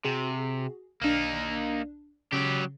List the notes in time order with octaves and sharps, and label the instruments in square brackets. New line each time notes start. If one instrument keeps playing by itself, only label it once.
[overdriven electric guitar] C3 [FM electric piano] F#4 G#4
[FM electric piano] B1 D4 [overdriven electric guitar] A#3 D#4
[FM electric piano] C#3 [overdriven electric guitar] F#3 G4